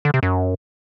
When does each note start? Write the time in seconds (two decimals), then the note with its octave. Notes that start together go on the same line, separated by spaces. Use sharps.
0.05 D3
0.14 C3
0.23 F#2